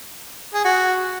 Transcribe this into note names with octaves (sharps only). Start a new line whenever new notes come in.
G#4
F#4